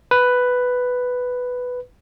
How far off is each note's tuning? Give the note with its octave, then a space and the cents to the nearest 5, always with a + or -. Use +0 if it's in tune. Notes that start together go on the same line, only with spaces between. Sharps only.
B4 +5